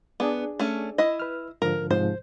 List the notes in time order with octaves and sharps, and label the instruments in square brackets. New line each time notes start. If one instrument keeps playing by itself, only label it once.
[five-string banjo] B3 [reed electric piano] D4 G#4 D5
[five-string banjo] A3 C#4
E4 D#5
[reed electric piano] B4 F6
[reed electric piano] G#2 D3 F3 [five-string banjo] A#4
[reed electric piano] G#2 C3 F3 [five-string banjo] C5